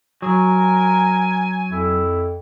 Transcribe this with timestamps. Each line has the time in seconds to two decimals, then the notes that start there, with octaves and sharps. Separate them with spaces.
0.22 F#3 A#4 G#5
1.69 F2 E4